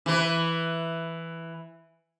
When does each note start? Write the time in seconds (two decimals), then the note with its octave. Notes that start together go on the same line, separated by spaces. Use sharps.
0.06 E3 B4